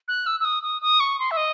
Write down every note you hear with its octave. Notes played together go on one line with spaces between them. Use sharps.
F#6
E6
E6
D#6
D#6
D#6
C#6
C6
E5
D#5